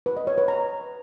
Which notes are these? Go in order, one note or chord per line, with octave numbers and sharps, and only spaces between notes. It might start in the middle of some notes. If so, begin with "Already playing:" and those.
B4
D#5
C#5
B4
A#5